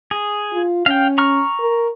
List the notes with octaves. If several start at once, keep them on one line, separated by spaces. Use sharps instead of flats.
G#4
F4
C#4 F5 G5
A#5 C#6 F6
A#4